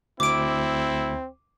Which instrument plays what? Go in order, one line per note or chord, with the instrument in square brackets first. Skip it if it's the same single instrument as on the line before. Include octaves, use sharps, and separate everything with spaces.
[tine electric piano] D2 [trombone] C4 [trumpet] E4 [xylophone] D6 D7